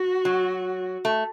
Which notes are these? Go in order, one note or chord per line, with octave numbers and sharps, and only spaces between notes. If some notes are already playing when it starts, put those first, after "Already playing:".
Already playing: F#4
F#3
A3